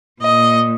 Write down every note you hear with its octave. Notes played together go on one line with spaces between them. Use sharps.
A#2 D#5